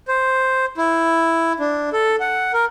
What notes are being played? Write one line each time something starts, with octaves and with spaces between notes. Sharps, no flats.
C5
E4
D4
A4
F#5
A#4